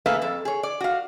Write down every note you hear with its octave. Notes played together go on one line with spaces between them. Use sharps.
A3 A#3 G#4 B4 E5 F5
F2 A4
G#4 C#5
D5
F#4 F5